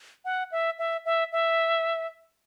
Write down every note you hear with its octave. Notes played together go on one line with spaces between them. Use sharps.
F#5
E5
E5
E5
E5